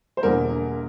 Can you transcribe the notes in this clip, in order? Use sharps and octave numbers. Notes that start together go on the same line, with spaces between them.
C5
E1 E2 D3 G3 A#3 A#4